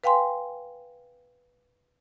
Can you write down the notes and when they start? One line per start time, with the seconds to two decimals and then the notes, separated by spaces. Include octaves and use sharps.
0.04 B4 F5 G5 G#5 C6